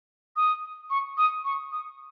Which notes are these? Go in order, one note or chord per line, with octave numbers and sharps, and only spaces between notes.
D#6
C#6
D#6
C#6
D#6